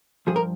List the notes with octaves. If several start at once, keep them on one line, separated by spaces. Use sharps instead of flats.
G2 F3 G#4
A#4